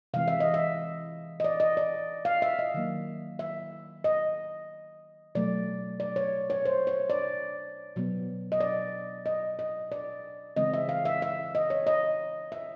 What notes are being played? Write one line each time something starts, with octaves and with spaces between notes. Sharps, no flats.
C3 E3 G#3 C4 F5
E5
D#5
E5
D#5
D5
D#5
D5
F5
E5
D#5
D#3 F#3 A#3
E5
D#5
B2 F#3 A3 D5
D5
C#5
C#5
C5
C#5
D5
B2 F#3 B3
D#5
D5
D#5
D#5
D5
C#3 E3 G#3 C4 D#5
E5
F5
E5
E5
D#5
C#5
D#5
E5